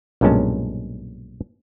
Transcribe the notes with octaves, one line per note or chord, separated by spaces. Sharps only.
B1 G2 A#2 G#3 C#4 A5